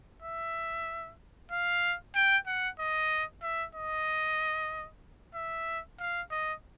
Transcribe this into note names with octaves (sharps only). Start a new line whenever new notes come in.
E5
F5
G5
F#5
D#5
E5
D#5
E5
F5
D#5